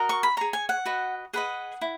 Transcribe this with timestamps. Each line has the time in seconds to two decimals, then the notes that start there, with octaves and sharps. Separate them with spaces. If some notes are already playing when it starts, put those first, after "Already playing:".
Already playing: F#4 A#4 D#5
0.09 C#6
0.23 B5
0.37 G#4 C#5 A#5
0.53 G#5
0.69 F#5
0.86 F#4 B4 D#5
1.33 G#4 B4 D#5 F#5
1.81 E4